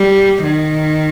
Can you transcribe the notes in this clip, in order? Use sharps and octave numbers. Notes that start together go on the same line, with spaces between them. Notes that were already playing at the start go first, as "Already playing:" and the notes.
Already playing: G3
D#3